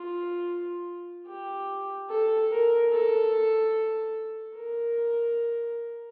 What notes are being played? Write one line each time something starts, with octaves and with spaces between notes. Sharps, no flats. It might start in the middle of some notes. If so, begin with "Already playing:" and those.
Already playing: F4
G4
A4
A#4
A4
A#4